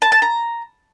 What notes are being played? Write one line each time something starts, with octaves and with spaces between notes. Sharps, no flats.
A5
A5
A#5